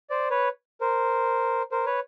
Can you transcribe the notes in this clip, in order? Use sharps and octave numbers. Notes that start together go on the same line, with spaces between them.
C5 D5
B4 C#5
A#4 C5
A#4 C5
B4 C#5